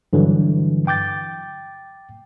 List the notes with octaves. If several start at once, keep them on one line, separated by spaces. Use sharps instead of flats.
G2 D3 E3 F#3
G5 D6 G6 A6